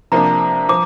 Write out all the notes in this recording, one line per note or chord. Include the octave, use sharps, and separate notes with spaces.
C3 F3 A#3 D4 A#5
F3 D6